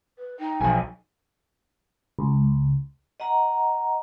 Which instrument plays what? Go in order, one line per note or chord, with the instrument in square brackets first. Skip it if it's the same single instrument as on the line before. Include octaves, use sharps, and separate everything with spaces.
[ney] B4
[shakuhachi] D#4 [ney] G5
[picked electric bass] B1 [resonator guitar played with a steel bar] F3 G#5
[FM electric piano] C#2
[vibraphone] D#5 F#5 A#5